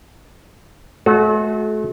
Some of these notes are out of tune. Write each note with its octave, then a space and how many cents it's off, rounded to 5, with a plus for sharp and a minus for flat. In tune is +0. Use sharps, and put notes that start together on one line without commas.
A3 -40 F#4 -20 A4 -35